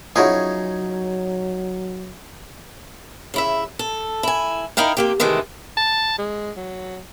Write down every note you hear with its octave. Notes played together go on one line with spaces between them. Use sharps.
F3 F#3 C#4 D#4 E4 F#4 G#4
C#3 E4 E5
A4
E4 G#5
D#4 E4 A#4 F5 G5
C3 A#3 G4
C3 D#3 E3 G#3 A3
A5
G#3
F#3